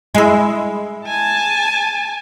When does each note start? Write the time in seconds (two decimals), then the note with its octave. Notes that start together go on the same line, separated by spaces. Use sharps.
0.15 G#3 E4
1.06 G#5 A5